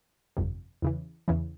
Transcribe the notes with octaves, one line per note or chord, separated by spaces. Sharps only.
G1 F2 C3
E2 C#3 E3
E2 C#3 E3